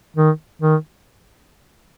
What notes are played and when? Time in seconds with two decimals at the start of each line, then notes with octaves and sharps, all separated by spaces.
0.16 D#3
0.62 D#3